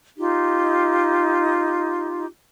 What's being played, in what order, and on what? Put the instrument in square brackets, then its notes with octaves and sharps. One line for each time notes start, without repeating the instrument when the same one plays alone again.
[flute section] D#4 F4 G4